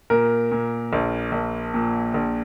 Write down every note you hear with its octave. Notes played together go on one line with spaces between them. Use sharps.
A#2 A#4
A#2
A#1
A#1
A#2
A#1